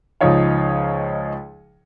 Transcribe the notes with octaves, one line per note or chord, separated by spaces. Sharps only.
C#2 F3 D#4 C#5 F5